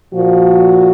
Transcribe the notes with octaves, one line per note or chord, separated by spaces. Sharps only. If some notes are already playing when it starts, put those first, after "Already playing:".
A#2 F3 F#4